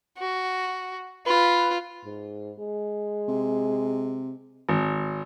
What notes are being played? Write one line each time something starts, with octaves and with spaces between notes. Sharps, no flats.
F#4
F4 B4
G#2
G#3
C3
G#1